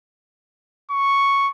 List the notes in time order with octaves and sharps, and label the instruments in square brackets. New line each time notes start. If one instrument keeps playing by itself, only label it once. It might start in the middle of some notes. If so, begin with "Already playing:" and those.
[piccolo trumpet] C#6